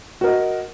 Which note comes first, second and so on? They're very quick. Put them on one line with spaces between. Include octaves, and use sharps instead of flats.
F#4 A#4 D#5